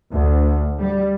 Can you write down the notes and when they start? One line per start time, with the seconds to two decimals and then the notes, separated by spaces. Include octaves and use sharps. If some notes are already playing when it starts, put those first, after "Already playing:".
0.12 D2
0.80 G3